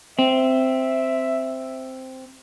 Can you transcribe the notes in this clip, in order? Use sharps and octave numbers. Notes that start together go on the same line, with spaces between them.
C4 E5